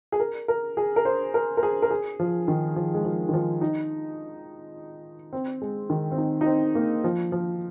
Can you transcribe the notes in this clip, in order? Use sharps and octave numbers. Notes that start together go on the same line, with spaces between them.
G#4
A#4
A#4
G#4
A#4
C5
A#4
A#4
G#4
A#4
G#4
F3
D#3
F3
G#3
F3
D#3
F3
D#4
C4
G#3
D#3
C4
D#4
D#4
C4
A#3
F3
F3